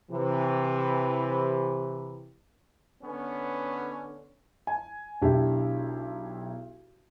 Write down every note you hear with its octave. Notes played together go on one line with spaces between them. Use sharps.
C3 E3
D3 B3 C#4
G#5
B1 D4 E4 G4